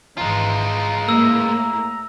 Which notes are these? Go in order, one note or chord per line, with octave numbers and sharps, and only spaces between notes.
G#1 E3 G#3 F4 A#5
A2 A#3 E4 E6